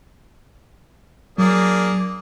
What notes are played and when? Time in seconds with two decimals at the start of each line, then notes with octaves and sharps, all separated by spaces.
1.38 F#3 A#3 D4 G#4